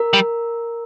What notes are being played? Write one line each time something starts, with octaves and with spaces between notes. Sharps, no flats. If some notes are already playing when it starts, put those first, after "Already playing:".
Already playing: A#4
G3